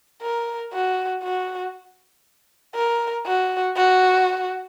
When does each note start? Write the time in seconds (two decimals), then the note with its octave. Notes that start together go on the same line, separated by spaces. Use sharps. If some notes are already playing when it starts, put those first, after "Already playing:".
0.22 A#4
0.73 F#4
1.23 F#4
2.75 A#4
3.25 F#4
3.76 F#4